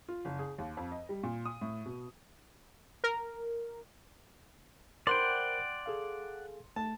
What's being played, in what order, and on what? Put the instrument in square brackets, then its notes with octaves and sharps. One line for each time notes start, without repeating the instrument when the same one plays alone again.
[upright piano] F4
F#1
G#4
D#2
F2
D#5
G3
A#2
D#6
A2
B2
[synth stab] A#4
[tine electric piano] A#4 C5 B5 [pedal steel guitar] D5 F#5 G5 [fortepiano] C6
[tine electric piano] G#4 A4 F5
[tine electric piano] A3 [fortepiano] A5